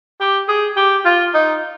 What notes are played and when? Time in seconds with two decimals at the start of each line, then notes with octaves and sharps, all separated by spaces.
0.20 G4
0.48 G#4
0.77 G4
1.05 F4
1.34 D#4